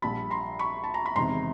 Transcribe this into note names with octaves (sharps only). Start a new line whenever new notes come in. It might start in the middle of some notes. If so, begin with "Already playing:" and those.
A#1 A#2 G3 A5 B5
A#5 C6
B5 C#6
A5
A#5
B5
E1 E2 C3 D#3 A#5 C6